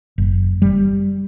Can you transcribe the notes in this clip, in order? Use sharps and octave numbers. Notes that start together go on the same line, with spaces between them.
F#1
G3